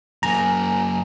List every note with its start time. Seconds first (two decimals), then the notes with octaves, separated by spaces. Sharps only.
0.23 F#2 A#3 G#5 A#5